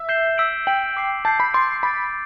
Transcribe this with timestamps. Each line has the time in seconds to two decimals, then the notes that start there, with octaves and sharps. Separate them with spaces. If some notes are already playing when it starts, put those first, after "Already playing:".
Already playing: E5
0.09 G6 C7 E7 G7
0.38 E6 B6 D7 F#7
0.67 G5 E6 B6 D7 F#7
0.97 D6 G6 C7
1.25 A5 D6 G6 C7
1.40 B5
1.54 C6 D6 A6 D7
1.83 B5 D6 A6 D7